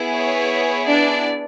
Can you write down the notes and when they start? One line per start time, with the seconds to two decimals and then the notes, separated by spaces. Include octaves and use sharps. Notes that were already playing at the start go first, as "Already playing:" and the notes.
Already playing: B3 E4 G#4
0.14 C#5
0.87 D4 D5